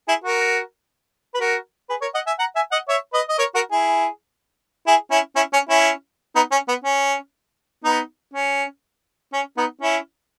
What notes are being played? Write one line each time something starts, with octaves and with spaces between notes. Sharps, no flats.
E4 G#4
F#4 A#4
B4
F#4 A#4
G#4 B4
A#4 C#5
D#5 F#5
E5 G#5
F#5 A#5
E5 G#5
D#5 F#5
C#5 E5
B4 D#5
D#5
A#4 C#5
F#4 A#4
E4 G#4
E4 G#4
C#4 E4
C#4 E4
C#4
C#4 E4
B3 D#4
C#4
B3
C#4
B3 D#4
C#4
C#4
B3 D#4
C#4 E4